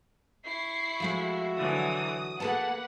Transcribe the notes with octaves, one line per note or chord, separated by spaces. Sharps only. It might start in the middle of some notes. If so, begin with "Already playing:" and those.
E4 C#6 C7
F3 G#3 A3 F#4 E5
D3 E3 F#3 D#6
A#3 G#4 A4 B4 F#5 A5